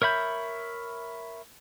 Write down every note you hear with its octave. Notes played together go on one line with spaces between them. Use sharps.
A#4 C#5 E5 B5 G6